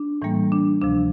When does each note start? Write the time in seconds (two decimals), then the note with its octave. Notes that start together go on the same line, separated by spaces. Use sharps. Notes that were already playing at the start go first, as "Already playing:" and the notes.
Already playing: D4
0.22 A2 E3 G3 A#3
0.52 D4
0.82 D2 C3 F3 D4